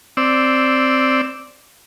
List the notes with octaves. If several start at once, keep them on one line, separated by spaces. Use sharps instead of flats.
C4 D5 E6